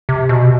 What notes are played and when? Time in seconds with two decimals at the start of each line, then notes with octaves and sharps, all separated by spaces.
0.09 C3
0.29 B2